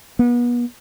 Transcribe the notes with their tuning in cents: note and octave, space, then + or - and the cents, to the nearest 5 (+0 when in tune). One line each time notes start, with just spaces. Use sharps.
B3 -35